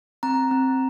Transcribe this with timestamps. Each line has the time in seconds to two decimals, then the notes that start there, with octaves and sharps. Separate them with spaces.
0.23 C4 A#5
0.51 C4